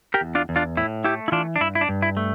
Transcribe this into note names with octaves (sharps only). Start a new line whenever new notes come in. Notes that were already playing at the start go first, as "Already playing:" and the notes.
G4 A#4
E2
D4 F4
E2
D4 F4
A2 E4
A3 E4 G4
E4
E3 D4 F4
D4
G2 E4
E4
D4
G2
E4
A3